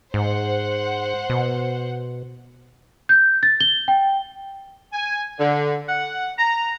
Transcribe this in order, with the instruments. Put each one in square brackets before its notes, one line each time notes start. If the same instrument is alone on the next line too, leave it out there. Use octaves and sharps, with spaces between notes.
[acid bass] G#2 [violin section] C5 F#5
[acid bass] B2
[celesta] G6
A6
G7
G5
[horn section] G#5
D3
F#5
A#5